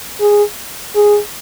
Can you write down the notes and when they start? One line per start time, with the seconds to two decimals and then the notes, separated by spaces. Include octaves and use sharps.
0.21 G#4
0.95 G#4